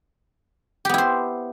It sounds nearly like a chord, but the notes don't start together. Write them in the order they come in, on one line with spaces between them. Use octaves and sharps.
G4 B3 E4 C5